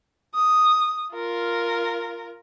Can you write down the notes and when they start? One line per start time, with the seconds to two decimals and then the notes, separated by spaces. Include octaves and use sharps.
0.35 D#6
1.14 F4 A#4